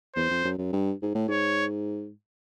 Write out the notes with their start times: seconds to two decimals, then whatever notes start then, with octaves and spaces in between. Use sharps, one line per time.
0.15 E2 C5
0.30 F2
0.45 F#2
0.58 F#2
0.73 G2
1.02 G#2
1.15 A2
1.29 G#2 C#5